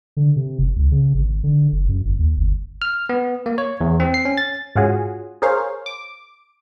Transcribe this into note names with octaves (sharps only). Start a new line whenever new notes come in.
D3
C3
F#1
C#2
C#3
G#1
D3
F#1
F#2
G1
D#2
G1
F6
B3
A#3
C#5
E2
C4
C7
C#4
A6
G#2 C#4 F4 F#4 G#4
G#4 A#4 C5 C#5 F5
D6